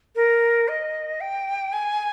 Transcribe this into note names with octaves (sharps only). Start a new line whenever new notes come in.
A#4
D#5
G5
G#5